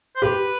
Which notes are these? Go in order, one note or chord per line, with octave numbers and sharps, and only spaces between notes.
C5
G4 B4